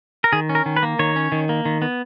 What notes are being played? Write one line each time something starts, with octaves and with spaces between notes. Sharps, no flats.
A#4
D#3 G#4
C#4
A#4
D#3
B4
A#3
D#3 C#5
C#4
D#3
A#3
D#3
B3